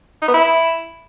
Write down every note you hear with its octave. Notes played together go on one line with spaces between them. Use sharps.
D#4
B3
E4